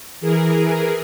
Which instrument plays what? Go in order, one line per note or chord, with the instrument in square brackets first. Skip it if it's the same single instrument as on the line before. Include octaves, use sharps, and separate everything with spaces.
[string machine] E3 G#4 A#4